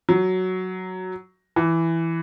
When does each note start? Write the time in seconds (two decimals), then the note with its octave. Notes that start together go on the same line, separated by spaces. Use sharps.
0.09 F#3
1.56 E3